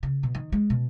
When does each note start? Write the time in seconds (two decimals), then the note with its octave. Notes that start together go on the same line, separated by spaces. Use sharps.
0.03 C#3
0.23 B2
0.35 D#3
0.52 G#3
0.70 B2